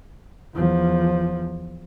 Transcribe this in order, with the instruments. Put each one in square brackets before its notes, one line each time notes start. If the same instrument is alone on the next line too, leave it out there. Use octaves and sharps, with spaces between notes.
[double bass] E2 F3